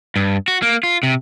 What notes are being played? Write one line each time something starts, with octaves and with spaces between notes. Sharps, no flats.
G2
F#4
A#3
F4
C3